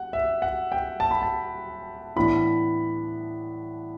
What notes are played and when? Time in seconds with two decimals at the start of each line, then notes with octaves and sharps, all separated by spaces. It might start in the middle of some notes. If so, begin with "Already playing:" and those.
Already playing: F#5
0.13 E5
0.42 F#5
0.72 G5
1.00 A5
1.11 B5
1.22 A5
2.16 A2 E3 B3 D4 B5